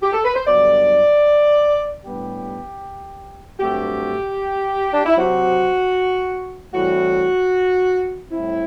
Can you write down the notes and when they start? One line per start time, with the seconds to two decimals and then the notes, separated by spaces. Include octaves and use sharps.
0.02 G4
0.13 A4
0.25 B4
0.35 C5
0.46 G2 D3 F#3 B3 D5
2.03 A2 G3 B3 D4 G4
3.60 G2 F#3 A3 C4 G4
4.94 D4
5.05 E4
5.17 C3 F#3 C4 F#4
6.73 A2 E3 G3 C4 F#4
8.30 A2 G3 C4 E4